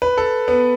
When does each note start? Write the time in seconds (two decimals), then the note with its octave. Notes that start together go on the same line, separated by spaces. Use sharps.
0.02 B4
0.17 A4
0.48 B3